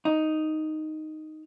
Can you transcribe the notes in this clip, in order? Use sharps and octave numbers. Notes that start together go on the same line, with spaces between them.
D#4